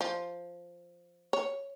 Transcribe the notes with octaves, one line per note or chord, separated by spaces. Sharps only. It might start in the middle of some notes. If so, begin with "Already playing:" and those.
F3
C#5